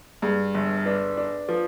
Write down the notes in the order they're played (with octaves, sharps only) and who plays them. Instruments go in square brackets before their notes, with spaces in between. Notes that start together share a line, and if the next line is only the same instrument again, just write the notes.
[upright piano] G2 [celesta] G#4
[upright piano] G1
[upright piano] D4 [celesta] B4
[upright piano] D4
[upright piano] F3 [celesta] B4